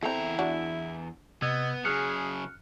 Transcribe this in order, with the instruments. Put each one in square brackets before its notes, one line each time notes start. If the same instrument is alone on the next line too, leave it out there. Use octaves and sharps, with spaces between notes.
[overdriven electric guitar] E2 A#5 [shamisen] C4 A4 [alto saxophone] E4
[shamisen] D4 F#4
[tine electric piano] C3 E6 G#6 [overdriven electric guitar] B3 [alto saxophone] D#5
[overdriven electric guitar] C#3 F#3 [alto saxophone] G#4 [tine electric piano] F6 F#6 C#7